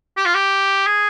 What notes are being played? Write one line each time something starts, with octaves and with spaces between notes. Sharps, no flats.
G4
F4
G4
G#4